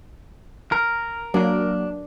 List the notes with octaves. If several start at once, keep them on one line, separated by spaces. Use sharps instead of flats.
A#4
F#3 A#3 D4